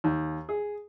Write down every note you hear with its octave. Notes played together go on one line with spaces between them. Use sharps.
D#2
G#4